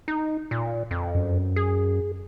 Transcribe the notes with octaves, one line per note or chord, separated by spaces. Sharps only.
D#4
A#2
F2
F#2
G#4